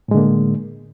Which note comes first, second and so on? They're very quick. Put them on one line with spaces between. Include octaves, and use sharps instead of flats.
A2 G#3 D3 A#3